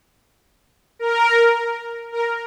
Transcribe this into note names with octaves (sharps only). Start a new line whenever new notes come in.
A#4
A#4